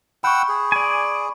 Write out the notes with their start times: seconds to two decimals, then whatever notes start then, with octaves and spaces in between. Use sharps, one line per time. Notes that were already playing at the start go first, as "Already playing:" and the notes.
0.24 F#5 G5 B5 C#6 E6
0.49 G#4
0.72 D5 G#5